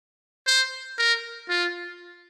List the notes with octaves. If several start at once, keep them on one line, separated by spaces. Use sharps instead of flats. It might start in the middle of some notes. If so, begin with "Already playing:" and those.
C5
A#4
F4